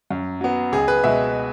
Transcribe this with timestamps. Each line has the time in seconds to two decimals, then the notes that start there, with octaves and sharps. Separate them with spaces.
0.11 F#2
0.41 F#3 B3
0.72 C#2 G#4
0.88 B4
1.04 B2 G#3 E5